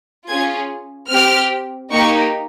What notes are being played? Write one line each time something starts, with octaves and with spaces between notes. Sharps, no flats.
C#4 F4 G#4 G#6
C4 G4 F6
A#3 D#4 G4 C#6